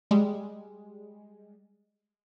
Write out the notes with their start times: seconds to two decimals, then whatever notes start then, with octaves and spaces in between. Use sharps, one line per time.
0.11 G3 G#3